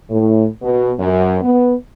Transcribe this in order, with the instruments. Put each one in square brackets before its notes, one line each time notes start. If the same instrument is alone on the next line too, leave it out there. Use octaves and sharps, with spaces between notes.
[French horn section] A2
B2
F#2
B3